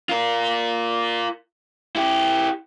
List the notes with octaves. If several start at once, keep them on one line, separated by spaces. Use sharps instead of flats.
F4 A#4
E4 G4